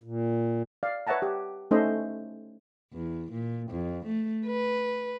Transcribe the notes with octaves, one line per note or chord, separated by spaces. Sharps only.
A#2
D5 F5
B4 C#5 E5 F#5 A5 A#5
G4
A3 C#4 D#4 A4 C5 D#5
E2
A#2
F2
A3
B4